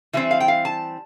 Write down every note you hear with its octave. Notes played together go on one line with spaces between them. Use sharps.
E3 G3 C4 E5
F5
G5
F5
A5